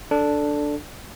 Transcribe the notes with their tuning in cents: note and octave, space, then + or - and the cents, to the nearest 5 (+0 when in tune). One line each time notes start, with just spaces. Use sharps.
D4 +0 A4 +0